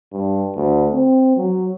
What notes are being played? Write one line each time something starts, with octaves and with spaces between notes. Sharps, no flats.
G2
D2
C4
F#3